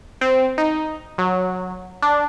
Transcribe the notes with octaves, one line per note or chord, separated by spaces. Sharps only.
C4
D#4
F#3
D4